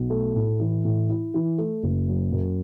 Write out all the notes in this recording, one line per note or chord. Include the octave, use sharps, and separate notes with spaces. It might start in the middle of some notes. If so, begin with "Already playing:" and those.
Already playing: B1
A3
A2
E3
A2
E4
E3
A3
F#1
F#3
F#2